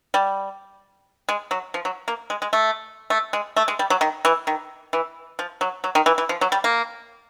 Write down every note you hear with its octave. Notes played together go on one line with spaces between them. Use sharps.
G3
G#3
F#3
F3
F#3
A#3
G#3
G#3
A3
A3
G#3
A3
G#3
G3
F#3
D#3
E3
D#3
E3
F3
F#3
F#3
D#3
E3
E3
F3
F#3
G3
A#3